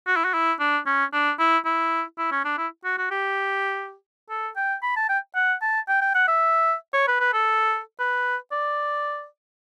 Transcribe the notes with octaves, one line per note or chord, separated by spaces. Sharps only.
F#4
E4
F#4
E4
D4
C#4
D4
E4
E4
E4
C#4
D4
E4
F#4
F#4
G4
A4
G5
B5
A5
G5
F#5
A5
G5
G5
F#5
E5
C#5
B4
B4
A4
B4
D5